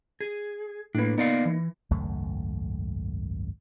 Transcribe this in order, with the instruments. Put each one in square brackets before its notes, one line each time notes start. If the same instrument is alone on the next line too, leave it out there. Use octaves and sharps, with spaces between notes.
[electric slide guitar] G#4
[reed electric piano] A2 B4 [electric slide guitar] A#3 D4
[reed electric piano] A#3 D#4 [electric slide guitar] B3 D5 F5
[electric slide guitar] E3
[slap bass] G#1 C#2 F#2 A3